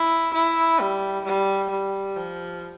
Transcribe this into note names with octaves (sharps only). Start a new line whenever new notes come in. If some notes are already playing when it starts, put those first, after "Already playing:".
Already playing: E4
E4
G3
G3
G3
F3